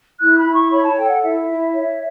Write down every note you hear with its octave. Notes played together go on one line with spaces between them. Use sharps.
E4 F#6
B5
E4
C#6
C#5 B5
A5
A4 G5
F#5
E4 E5
E4
C#5